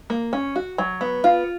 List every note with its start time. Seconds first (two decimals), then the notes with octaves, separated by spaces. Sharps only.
0.10 A#3
0.33 C#4
0.56 F#4
0.78 F#3
1.01 B3
1.24 F4